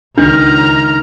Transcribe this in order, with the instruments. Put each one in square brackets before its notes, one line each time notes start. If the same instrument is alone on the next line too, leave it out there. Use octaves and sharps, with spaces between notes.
[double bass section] C#2 [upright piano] D#3 [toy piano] D4 [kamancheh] A#5 F6